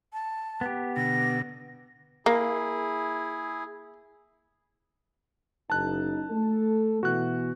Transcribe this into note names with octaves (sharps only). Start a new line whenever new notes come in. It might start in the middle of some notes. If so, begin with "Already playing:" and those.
A5
B3 G4
B2 D3 A#6
A#3 E4 G#4
F#1 D#4 A5 F#6
A3 A4
B2 E3 F#4 F#6